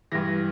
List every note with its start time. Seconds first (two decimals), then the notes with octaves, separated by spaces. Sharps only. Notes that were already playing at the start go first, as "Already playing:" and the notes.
0.12 G2 E3 A#6